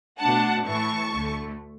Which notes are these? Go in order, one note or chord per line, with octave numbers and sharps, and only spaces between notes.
B2 A3 D4 F#5 A5
A2 E3 A3 A5 C#6
D2 D3 A3